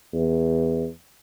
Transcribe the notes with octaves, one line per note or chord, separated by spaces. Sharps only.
E2